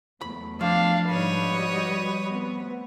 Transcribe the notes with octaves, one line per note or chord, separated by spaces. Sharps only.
E2 F#3 A3 B5
F3 D4 F5
G#2 D3 G3 D#4 B4 C#5 D#6
F#4 D#5
A3 B3 C4